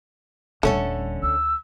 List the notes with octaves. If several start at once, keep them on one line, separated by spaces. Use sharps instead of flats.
D#1 D3 G3 A3 C#4 A4
D2 E6